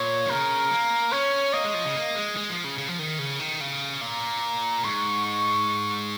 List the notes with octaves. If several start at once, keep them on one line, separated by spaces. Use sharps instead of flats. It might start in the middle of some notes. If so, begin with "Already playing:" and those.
Already playing: A#2 C#5
D#3
C#3 A#4
A#3
C#4 C#5
A#3 D#5
G#3
F3
C#3
A#3
G#3
G#3
F3
C#3
C#3
F3
D#3
C#3
D#3
C#3
A#2 A#5
G#2 C#6
C#6